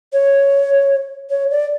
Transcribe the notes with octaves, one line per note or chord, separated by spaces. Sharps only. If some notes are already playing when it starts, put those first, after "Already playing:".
C#5
C#5
D5